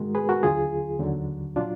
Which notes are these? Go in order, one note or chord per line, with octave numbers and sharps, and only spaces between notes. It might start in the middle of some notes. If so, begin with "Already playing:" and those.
Already playing: G#2 D#3 G#3 F#4 A#4
G#4 B4
F#4 A#4
D#2 D3 F#3 F4 G#4
D#2 D3 F#3
A#2 F#3 D4 F4